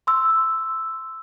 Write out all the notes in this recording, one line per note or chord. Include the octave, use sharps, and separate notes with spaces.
C6 E6